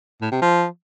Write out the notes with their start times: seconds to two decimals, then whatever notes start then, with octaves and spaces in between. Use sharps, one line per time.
0.22 A2
0.32 C3
0.42 F3